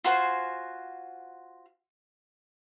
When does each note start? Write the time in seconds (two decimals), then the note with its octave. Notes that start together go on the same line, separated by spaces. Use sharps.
0.04 F4 F#4 C5 G#5